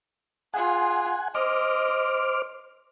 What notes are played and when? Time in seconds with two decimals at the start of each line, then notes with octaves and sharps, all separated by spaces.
0.54 F4 G#4 F#5 G#5
1.35 C5 D#5 D6 F6